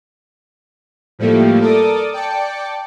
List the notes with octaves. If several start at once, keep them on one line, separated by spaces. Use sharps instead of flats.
A2 F3 G3 A3 A#3
A4 A#4 D5 D6 D#6
D5 G5 A5 D6 C#7